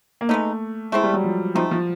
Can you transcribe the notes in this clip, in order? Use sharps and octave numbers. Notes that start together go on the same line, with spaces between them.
A#3
G#3 A3 B3 D#4
G#3 A3 C4 E4
G3
F#3
F3
F3 A3 C4 D#4
F3